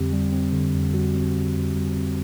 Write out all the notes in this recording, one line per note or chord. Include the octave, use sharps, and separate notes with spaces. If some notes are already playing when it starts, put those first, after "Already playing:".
Already playing: F2 D3 G3 C4 G4
G3
C4
D3
F2
G3 F#4
C4
D3
F2
G3
C4